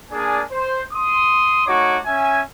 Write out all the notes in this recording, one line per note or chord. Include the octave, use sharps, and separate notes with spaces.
A#3 D4 G#4 D5 G#5
C5
C6 D#6
A3 D#4 F#4 C#5 D6
C#4 E5 G#5